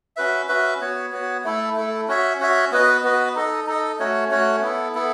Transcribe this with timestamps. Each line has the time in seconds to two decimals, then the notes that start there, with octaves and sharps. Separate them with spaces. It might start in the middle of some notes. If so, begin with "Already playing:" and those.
0.16 C#4 F#4 B4 E5
0.49 C#4 F#4 B4 E5
0.81 B3 F#4 C#5
1.12 B3 F#4 C#5
1.44 A3 E4 A4
1.76 A3 E4 A4
2.08 C#4 F#4 C#5 E5
2.40 C#4 F#4 C#5 E5
2.71 B3 F#4 B4 D#5
3.03 B3 F#4 B4 D#5
3.35 D#4 A4 D#5
3.67 D#4 A4 D#5
3.99 A3 C#4 F#4 C#5
4.30 A3 C#4 F#4 C#5
4.62 B3 E4 A4
4.95 B3 E4 A4